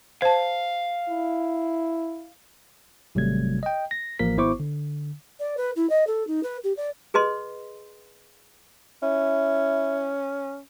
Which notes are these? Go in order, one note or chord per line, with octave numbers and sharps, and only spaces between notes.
C5 F5 A5
E4
G#1 C3 F#3 G3 A3 G#6
D#5 G5
A#6
A1 F3 A#3 A#4 B6
G#1 B3 E4 C5 C#6 D6
D3
D5
B4
E4
D#5
A4
D#4
B4
G4
D5
G#4 B4 D#5 C6
C#4 E4